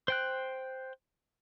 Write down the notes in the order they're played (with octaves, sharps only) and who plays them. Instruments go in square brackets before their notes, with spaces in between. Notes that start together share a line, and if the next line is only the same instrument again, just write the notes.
[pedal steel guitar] C5 G5 F#6